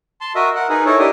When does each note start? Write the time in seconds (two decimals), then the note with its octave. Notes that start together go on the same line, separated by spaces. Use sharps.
0.21 A5 C6
0.35 F#4 A#4 D#5 E5
0.55 A#4 F#5
0.69 D#4 G#4 A#4 B4
0.85 D#4 E4 A4 A#4 C#5
0.99 D4 E4 G4 A#4 D#5